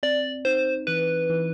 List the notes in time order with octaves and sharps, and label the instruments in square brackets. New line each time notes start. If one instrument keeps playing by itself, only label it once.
[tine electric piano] C4 [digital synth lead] D5
[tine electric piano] D#4 [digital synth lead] C5
[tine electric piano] E3 [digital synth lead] B4
[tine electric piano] E3